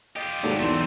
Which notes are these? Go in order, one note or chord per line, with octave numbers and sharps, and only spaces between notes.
F4 G4 D#5
D#2 G#2 F#4 A4 D5
B1 E2 A3 C4 C6